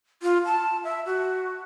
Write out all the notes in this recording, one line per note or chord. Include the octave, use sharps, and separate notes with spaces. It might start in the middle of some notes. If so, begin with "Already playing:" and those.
F4
A5
E5
F#4